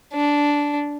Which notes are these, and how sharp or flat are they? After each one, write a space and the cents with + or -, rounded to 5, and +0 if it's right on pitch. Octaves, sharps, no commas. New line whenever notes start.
D4 -10